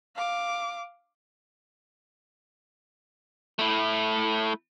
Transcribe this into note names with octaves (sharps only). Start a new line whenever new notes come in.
F5 D6
A3 E4